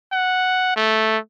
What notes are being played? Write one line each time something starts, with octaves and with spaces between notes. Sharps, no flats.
F#5
A3